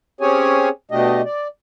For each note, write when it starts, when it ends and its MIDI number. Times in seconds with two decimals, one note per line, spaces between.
0.21 0.69 60
0.21 0.69 61
0.21 0.69 67
0.21 0.69 68
0.21 0.69 73
0.21 0.69 80
0.91 1.22 47
0.91 1.22 57
0.91 1.22 62
0.91 1.22 67
0.91 1.22 75
1.25 1.48 74